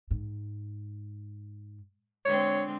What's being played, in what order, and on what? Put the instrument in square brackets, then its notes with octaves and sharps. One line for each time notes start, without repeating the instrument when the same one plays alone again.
[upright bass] G#2
[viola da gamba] D3 G#3 C4 [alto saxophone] C#5